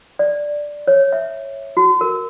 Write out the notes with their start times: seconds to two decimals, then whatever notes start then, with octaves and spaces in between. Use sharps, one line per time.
0.19 D5
0.87 C#5
1.12 E5
1.77 F#4
2.01 A#4